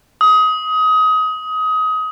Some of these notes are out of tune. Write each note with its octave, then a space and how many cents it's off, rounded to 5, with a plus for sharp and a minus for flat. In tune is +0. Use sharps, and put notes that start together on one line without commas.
D#6 +25